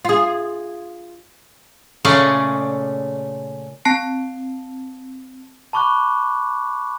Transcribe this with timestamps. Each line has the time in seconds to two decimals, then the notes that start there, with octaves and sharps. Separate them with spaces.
0.05 F4 G#4
2.05 A#2 C#3 A3 C#4 G#4 D5
3.85 C4 A5 C7
5.73 A5 B5 C#6 D6 F#6